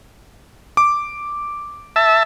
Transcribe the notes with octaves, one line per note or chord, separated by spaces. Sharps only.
D6
E5 A5